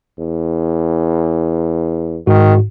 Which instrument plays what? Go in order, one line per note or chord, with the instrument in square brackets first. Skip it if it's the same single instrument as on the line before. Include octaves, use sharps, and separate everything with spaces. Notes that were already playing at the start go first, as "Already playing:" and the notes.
[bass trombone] E2
[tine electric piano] G#2 F#4 [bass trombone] D#3